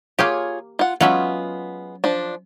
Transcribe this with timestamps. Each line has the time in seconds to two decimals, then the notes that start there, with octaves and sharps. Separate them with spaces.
0.19 A#3 F4 G4 G#4 C#5
0.79 F4 F#5
1.01 F#3 G#3 B3 C#4 F4 E5
2.04 F3 D4